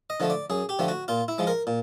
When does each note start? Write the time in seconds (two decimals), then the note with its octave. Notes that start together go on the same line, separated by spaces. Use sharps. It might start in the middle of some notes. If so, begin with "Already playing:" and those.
0.10 D#5
0.20 D3 F3 A3
0.30 D5
0.50 F#2 G#4
0.69 G4
0.79 D3 F3 A3
0.88 F#4
1.08 A#2 F4
1.28 E4
1.38 F3 G#3
1.47 A#4
1.67 A#2